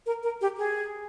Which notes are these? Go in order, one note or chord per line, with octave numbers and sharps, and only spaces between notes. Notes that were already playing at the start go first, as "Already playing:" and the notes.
A#4
A#4
G4
G#4